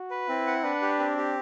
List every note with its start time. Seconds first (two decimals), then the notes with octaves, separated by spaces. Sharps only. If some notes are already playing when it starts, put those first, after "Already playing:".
Already playing: F#4
0.11 B4
0.29 C4 E4
0.47 F#5
0.63 D4 B4
0.82 G4
0.99 C4
1.17 G4